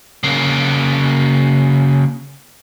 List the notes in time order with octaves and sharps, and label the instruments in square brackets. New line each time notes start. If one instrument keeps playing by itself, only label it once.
[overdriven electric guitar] C#3 A#3